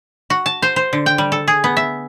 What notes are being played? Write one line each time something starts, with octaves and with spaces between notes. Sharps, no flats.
F#4
A5
C5
C5
D3
G5
G3
A4
G#4
B3
E5